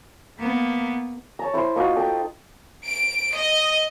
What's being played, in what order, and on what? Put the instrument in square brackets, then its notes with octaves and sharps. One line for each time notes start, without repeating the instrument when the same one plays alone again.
[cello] A#3 B3
[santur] C#5 A5 A#5
E4 C5 B5 C6
A#3 D#4 F4 F#4
A4 D#5 G5
[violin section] D7
D#5